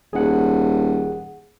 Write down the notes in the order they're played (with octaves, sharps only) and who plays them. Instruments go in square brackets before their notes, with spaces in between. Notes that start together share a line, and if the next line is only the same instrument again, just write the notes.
[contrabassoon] D#1 [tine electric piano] G#4 F#5